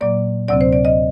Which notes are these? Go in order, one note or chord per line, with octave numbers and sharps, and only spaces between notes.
A#2 F#3 A#3 D5
D2 C3 F#3 C4 D5
C5
D5
D#5